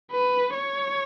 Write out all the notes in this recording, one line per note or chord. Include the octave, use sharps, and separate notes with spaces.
B4
C#5